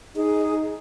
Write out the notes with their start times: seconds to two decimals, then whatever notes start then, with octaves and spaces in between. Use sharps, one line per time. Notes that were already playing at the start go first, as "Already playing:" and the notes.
0.16 D#4 G#4